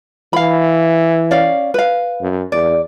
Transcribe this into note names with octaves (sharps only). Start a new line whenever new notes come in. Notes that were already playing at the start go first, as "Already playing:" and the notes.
E3 F5 B5
C#4 D5 F5
B4 F5
F#2
E2 D5